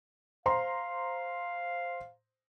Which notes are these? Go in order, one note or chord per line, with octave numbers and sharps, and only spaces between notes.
C5 F5 A#5 C6